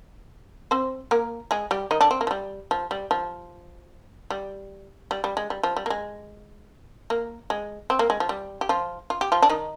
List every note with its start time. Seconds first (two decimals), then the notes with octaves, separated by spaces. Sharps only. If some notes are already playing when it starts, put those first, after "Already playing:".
0.71 C4 C5
1.11 A#3 A#4
1.51 G#3 G#4
1.71 G3 G4
1.91 D#3 D#4
2.01 D3 D4
2.11 C4
2.21 A#3
2.27 F3
2.31 G3
2.71 F3
2.91 G3
3.11 F3
4.30 G3
5.11 G3
5.24 G3
5.37 G#3
5.50 G3
5.63 F3
5.77 G3
5.86 A#3
5.90 G#3
7.10 A#3
7.50 G#3
7.90 C4
7.99 A#3
8.10 G#3
8.20 F3
8.29 G3
8.61 G4
8.69 F3 F4
9.10 F4
9.21 G4
9.32 F3 F4
9.42 D4
9.49 D#3 D#4